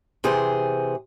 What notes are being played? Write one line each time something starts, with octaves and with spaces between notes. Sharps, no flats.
C3 E3 G#4 C5